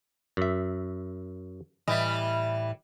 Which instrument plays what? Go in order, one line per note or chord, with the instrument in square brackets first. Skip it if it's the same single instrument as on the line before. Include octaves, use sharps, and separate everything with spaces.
[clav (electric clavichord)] F#2 E5
[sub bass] A2 [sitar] E3 G3 [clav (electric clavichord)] D#5